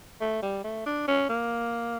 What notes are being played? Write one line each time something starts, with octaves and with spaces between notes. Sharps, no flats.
A3
G3
A3
D4
C#4
A#3